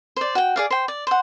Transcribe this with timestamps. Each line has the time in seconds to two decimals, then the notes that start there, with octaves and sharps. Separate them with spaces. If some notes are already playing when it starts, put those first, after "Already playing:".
0.16 C5 D5
0.35 F#4 G5
0.56 G#4 D5 F5
0.71 C5 G5
0.88 D5
1.07 C5 F#5